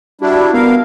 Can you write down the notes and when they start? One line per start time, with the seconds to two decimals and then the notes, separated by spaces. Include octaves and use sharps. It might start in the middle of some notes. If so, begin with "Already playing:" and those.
0.21 G3 D4 E4 F#4
0.54 B3 A#4 F5